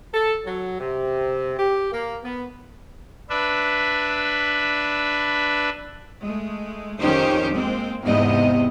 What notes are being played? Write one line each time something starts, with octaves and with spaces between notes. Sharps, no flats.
A4
F#3
C3
G4
A#3
B3
D4 B4 E5
G#3 A3
F2 D#3 C#4 D#4 G4 C5
G#3 A#3 C4
E2 G#2 C3 B3 D#5